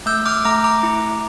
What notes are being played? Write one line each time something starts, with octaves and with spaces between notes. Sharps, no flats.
A3 E6 G6
D6 F6
A3 A#5 D6
A#5 D6
E4